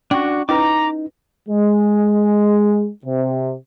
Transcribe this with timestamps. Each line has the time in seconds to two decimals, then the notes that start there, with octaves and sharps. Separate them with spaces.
0.11 C#4 D4 F#4 C#6
0.49 C#4 D#4 E4 B4 A#5 D6
1.49 G#3
3.05 C3